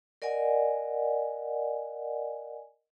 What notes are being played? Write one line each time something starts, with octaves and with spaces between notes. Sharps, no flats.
A#4 D5 D#5 F#5 G#5